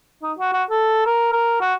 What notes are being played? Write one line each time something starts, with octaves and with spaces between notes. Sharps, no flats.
D#4
F#4
F#4
A4
A#4
A#4
F#4